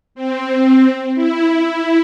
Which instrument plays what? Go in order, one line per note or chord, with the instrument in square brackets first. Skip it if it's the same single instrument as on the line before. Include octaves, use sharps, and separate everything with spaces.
[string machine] C4
E4